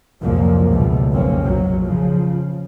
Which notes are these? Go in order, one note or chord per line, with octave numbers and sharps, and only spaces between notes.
C2 F2 A#2 F3 F#3 A#3
C#2 G2 B2 A3
F1 B1 G#3 A#3 C4 C#4
A#1 F#3
C#3 F3